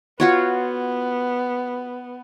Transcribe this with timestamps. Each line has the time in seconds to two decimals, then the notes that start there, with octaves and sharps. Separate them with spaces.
0.20 B3 F4 F#4 C#5